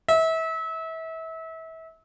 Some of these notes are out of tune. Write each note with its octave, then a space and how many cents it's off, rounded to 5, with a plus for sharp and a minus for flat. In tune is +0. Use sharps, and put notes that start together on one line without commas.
E5 -30